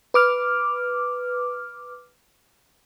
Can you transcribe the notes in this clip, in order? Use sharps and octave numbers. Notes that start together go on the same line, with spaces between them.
B4 D6 F6